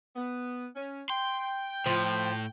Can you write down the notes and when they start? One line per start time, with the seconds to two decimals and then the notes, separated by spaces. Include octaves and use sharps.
0.16 B3
0.76 C#4
1.10 G5 C6
1.86 A2 F3